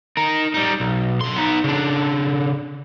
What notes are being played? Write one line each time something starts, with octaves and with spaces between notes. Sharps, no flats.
D#4 A#4
G3 D#4
B1
D3 C6
B3 D#4
C#3 D4